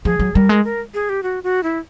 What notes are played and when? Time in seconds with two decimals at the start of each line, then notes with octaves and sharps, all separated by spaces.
0.05 F3 G#4
0.19 F#3
0.35 G3 A#4
0.49 G#3
0.64 A#4
0.94 G#4
1.09 G4
1.23 F#4
1.43 F#4
1.63 E4